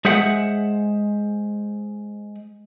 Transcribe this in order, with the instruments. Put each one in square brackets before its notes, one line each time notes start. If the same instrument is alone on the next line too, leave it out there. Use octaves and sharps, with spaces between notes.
[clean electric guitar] G#3 G#4 C5 E5 F#5